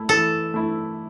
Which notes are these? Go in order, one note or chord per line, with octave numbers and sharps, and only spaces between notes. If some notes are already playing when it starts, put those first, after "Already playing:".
Already playing: A3 E4
E3 A4
A3 E4